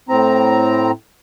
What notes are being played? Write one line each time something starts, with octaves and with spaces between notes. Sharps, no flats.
A2 C4 A#5